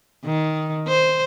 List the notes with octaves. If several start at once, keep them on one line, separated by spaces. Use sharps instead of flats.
D#3
C5